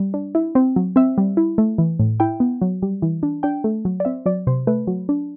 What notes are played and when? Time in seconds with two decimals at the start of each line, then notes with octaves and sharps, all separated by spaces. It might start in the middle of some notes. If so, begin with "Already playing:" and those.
Already playing: G3
0.14 D4
0.35 E4
0.55 C4
0.76 F#3
0.96 C4 E5
1.18 G3
1.37 E4
1.58 A3
1.78 E3
1.99 A2
2.20 E4 G5
2.40 B3
2.61 F#3
2.82 G3
3.02 E3
3.23 D4
3.43 D4 G5
3.64 A3
3.85 F#3
4.00 D5
4.05 C4 E5
4.26 F#3 D5
4.47 C3 C5
4.67 A3 B4
4.87 F#3
5.09 D4